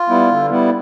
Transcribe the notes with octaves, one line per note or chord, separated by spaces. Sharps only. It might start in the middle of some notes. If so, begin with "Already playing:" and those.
Already playing: F4
G3 B3 E4
D3
G3 B3 E4